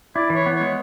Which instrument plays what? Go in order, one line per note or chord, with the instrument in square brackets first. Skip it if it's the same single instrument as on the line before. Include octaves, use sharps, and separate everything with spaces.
[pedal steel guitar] E4 [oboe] D5
[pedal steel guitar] E3
[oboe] C#5
[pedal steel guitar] B3
[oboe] C#5
[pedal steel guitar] G#3